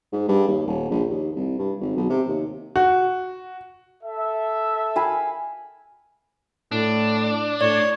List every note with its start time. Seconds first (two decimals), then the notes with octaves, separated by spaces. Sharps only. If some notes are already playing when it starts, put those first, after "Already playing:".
0.12 G#2
0.28 G2
0.48 D#2
0.67 D#1
0.90 A#1
1.10 D#2
1.35 C2
1.58 G2
1.80 G#1
1.96 B1
2.10 C3
2.28 D#2
2.76 F#4
4.03 A4 E5
4.96 F5 G#5 B5
6.72 A2 D4
7.61 A2 C#5 D5